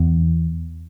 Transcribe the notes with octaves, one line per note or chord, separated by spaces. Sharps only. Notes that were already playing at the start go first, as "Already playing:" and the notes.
Already playing: E2